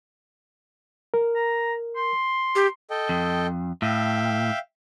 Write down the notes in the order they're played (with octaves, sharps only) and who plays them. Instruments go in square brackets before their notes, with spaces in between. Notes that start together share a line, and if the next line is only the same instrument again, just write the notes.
[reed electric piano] A#4
[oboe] A#5
C6
[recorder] G4
[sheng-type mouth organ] A4 D#5 G5
[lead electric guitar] F2
[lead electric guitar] A2 [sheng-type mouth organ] E5 F5 G5